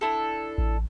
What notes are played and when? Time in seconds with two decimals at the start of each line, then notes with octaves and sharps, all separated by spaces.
0.01 D4 E4 A4
0.58 A1